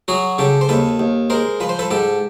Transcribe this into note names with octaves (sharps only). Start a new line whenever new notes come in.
F#3 F#4 G#4
C#3 G4 A4
C5
D#2 A4 B4
D#2
G#3 A#4 C5
F3 B4
C5
A4 B4
G#2 G4 A4